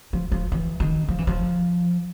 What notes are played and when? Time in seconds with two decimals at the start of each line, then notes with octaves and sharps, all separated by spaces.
0.13 F3
0.32 F3
0.52 E3
0.80 D#3
1.08 F3
1.18 E3
1.27 F3